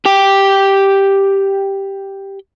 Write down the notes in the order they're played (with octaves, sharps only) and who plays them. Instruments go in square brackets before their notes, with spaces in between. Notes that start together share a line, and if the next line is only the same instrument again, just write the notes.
[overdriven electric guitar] G4 G5